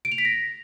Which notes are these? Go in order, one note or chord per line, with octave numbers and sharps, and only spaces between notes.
D7
F7
B6
A#6